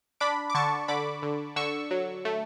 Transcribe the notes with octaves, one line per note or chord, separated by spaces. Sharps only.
D4 B5 D6
D6
D3 A5 C#6
D3 B5 D6
D3
D3 C#6 E6
F#3
A3